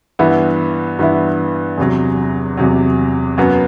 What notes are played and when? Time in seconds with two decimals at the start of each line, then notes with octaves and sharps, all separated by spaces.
0.19 G2 E3 B3 E4
0.99 G2 E3 B3 E4
1.78 E2 C3 F#3
2.57 E2 C3 F#3
3.38 F#2 F#3 B3